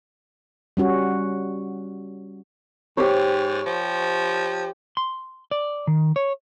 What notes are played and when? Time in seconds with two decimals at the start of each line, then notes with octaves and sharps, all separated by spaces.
0.77 G3 C#4 F#4
2.97 G#2 G4 C5 C#5
3.66 F3
4.97 C6
5.51 D5
5.87 D#3
6.16 C#5